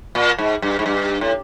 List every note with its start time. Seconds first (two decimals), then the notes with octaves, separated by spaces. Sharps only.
0.15 A#2
0.38 G#2
0.62 G2
0.79 G#2
0.86 G2
1.21 A2